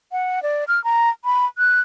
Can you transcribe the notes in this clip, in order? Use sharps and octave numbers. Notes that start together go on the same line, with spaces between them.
F#5
D5
F6
A#5
B5
F#6